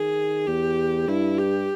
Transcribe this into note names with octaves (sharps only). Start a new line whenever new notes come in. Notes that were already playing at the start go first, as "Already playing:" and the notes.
Already playing: D#3 G#4
E2 G4
G2 E4
G4